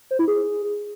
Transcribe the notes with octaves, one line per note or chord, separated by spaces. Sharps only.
C5
E4
G#4